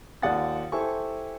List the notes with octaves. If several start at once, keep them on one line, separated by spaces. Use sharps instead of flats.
D#2 F4 D5 F#5 D#6 A6
E4 G4 A4 C5 G#5 C#6